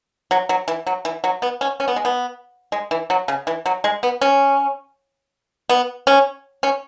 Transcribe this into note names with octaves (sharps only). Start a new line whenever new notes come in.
F#3
F#3
E3
F#3
E3
F#3
B3
C#4
C#4
B3
G#3
B3
G#3
E3
F#3
C#3
E3
F#3
G#3
B3
C#4
B3
C#4
C#4